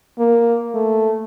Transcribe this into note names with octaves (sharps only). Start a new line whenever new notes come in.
A#3
A3